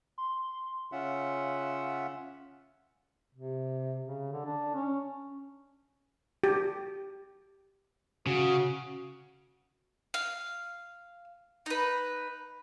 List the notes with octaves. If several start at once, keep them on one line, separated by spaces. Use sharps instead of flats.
C6
C#3 C#4 F4 E5 F#5
C3
C#3
D3
D4
C#4
G4
C#3 F#4
F5
D#4 B4